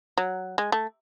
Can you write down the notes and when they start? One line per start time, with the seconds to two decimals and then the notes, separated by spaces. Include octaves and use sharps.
0.18 F#3
0.58 G#3
0.72 A3